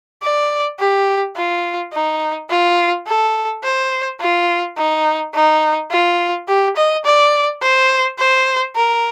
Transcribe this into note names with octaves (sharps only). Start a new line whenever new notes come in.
D5
G4
F4
D#4
F4
A4
C5
F4
D#4
D#4
F4
G4
D#5
D5
C5
C5
A#4